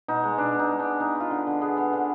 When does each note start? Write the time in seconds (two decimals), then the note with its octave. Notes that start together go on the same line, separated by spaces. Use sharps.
0.08 B2 D#4
0.23 G#3
0.38 B2 D4
0.55 B2 D#4
0.70 G#3
0.79 D4
0.85 B3
1.00 B3 D#4
1.15 B3
1.20 F4
1.30 D3
1.47 D3
1.61 B3 G#4
1.77 B3
1.93 D3